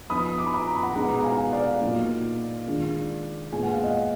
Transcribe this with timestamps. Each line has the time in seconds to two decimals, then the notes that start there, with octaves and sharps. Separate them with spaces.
0.10 F3 B3 D#4 B5 D#6
0.38 D6
0.46 B5
0.54 A#5 D6
0.67 A#5
0.75 B5
0.83 F#5 A#5
0.95 B2 G#3 B3 D#4 F#5 A#5
1.19 A#5
1.24 F5 G#5
1.52 D5 F5
1.81 A#2 F#3 A#3 D#4
2.67 D#3 G#3 D4 F4
3.52 A#2 G#3 B3 G#5
3.63 F#5
3.73 F5
3.84 D#5 F#5